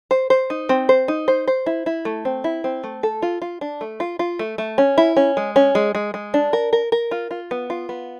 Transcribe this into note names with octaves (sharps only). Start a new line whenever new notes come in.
C5
C5
D#4
C4
C5
D#4
C5
C5
E4
E4
A3
C4
E4
C4
A3
A4
F4
F4
D4
A3
F4
F4
A3
A3
C#4
E4
C#4
G#3
C#4
G#3
G#3
G#3
D4
A#4
A#4
A#4
F4
F4
B3
F4
B3